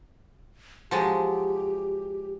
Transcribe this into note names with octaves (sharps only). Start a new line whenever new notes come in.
F3 F#3 G#3 G4